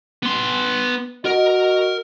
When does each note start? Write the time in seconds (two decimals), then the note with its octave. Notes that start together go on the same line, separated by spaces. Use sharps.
0.23 B3 C6
1.25 F#4 A#4 D#5